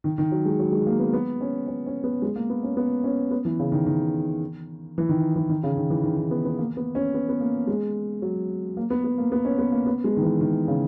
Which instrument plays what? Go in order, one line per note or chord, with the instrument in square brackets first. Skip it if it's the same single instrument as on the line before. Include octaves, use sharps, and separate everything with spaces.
[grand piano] D#3
D#3
F#3
G#3
F#3
G#3
A#3
B3
B3
C#4
C#4
C#4
B3
G#3
A#3
B3
C#4
B3
C#4
B3
E3
C#3
D#3
D#3
E3
D#3
E3
D#3
C#3
D#3
E3
D#3
D#3
B3
B3
A#3
B3
C#4
B3
B3
A#3
G#3
F#3
A#3
B3
B3
A#3
B3
C#4
B3
A#3
B3
G#3
D#3
E3
D#3
C#3